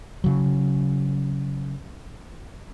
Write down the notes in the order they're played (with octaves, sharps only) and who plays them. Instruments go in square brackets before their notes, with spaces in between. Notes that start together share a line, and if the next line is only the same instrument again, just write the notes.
[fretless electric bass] C#3 F#3